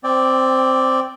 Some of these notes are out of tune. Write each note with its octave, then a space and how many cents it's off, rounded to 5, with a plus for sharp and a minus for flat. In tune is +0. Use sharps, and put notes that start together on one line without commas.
C4 +0 D5 +0 G5 +25